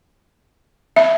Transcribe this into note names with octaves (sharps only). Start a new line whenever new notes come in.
E5